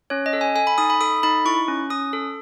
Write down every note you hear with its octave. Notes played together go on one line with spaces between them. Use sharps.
C#4 C#5
D#5
A4
G#5
A4 G#5
B5
D#4 D#6
B5
A4 D#6
D#4 B5
E4 C#6
C#4
C#4 D#6
A4